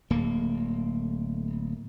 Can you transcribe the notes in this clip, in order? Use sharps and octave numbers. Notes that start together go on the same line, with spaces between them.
D1 A#3